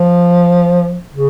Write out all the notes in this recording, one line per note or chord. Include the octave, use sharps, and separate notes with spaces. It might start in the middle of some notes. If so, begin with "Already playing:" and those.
Already playing: F3
C#3